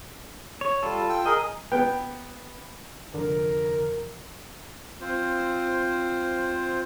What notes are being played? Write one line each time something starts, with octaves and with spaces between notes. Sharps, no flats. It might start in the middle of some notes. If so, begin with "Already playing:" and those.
C#5
G3 F4 A4
G5 E6
G#4 A#4 D#5
B3 G5
F1 D3 F3 A#4
C4 F4 C5